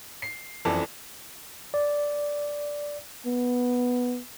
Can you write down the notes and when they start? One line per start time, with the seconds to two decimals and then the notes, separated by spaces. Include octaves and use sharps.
0.22 C7
0.65 F#1 F2 E3 A4 D5
1.74 D5
3.26 B3